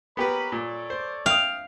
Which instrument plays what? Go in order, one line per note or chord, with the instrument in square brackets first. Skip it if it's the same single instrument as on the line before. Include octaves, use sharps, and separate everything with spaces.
[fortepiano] B3 G4 B4 [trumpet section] A#4 C#5 B5
[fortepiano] A#2 [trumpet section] A4 C#5 D5
[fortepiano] C5
[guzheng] F5 [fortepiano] G5 D#6